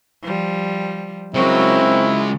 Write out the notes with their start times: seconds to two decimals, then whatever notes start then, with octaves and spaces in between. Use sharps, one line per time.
0.22 F3 G3
1.34 C#3 F#3 G#3 C4 E4 F#4 A#4